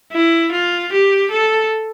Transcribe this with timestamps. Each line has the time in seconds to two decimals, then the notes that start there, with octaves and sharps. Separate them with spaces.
0.12 E4
0.52 F4
0.92 G4
1.31 A4